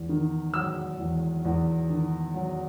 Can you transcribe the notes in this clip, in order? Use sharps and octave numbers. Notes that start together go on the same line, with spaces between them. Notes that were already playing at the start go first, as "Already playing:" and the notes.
Already playing: E2
D#3
F#3 E6
E2
E2
D#3
F#3